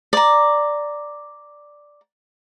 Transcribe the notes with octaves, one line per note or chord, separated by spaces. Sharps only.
D5 A#5